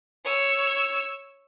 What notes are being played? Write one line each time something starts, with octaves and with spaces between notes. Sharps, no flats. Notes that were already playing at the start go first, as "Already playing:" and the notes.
C#5 E6